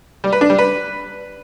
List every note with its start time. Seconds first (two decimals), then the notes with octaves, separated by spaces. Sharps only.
0.24 G3
0.32 B4
0.41 D4
0.50 G3
0.58 B4